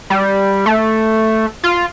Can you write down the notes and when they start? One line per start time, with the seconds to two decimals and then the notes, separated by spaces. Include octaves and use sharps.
0.10 G3
0.66 A3
1.64 F4